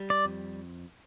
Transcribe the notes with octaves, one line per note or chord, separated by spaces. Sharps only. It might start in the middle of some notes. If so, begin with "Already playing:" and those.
Already playing: G3
D5
F2